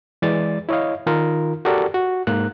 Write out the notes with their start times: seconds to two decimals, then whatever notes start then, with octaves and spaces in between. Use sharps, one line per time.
0.22 E3 G#3 D5 A6
0.69 E4 C#5 D#5 F5
1.06 D#3 F4 A#4
1.65 F#4 G4 A4 A#4 D5
1.94 F#4
2.27 G#2 A#3 F#6